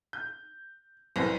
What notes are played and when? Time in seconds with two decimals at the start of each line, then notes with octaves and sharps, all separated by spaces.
0.13 G6
1.16 C2 F#2 C#4 B4 C5 A#6